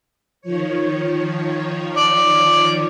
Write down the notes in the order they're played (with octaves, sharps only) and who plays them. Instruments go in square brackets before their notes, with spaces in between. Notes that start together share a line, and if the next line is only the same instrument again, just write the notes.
[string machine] D#3 F3 C#5
[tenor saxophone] D5